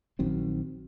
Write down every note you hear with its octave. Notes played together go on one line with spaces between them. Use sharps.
A#1 D#3 F#3 C4